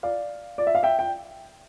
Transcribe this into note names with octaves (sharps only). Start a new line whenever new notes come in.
D5 F5
D5
E5
F5
E5 G5
G5